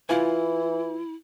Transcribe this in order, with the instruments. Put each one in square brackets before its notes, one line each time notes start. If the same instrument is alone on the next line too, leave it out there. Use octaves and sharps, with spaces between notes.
[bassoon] E3 [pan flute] E4 [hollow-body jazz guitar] F4 G#5